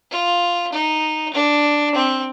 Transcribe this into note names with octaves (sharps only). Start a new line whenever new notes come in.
F4
D#4
D4
C4